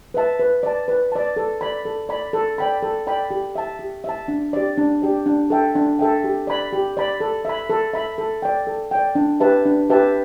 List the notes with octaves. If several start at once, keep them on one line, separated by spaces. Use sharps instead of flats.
B4 E5 A5
B4
D5 A5
B4
D5 A5
A4
D5 B5
A4
D5 B5
A4
D5 G5 B5
A4
D5 G5 B5
G4
E5 A5
G4
E5 A5
D4
G4 D5
D4
G4 D5
D4
A4 E5 G5
D4
A4 E5 G5
G4
D5 B5
G4
D5 B5
A4
E5 B5
A4
E5 B5
A4
D5 G5
A4
D5 G5
D4
G4 B4 E5 A5
D4
G4 B4 E5 A5